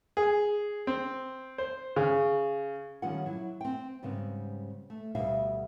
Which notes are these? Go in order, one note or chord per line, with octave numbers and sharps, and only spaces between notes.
G#4
C4
C5
C#3
D#3 F3 G3 C#4 F4 F#5
F#3 E4
C4 G5
G#2 C#3 G3 B3 C4
A3
D2 B2 G3 E5 F5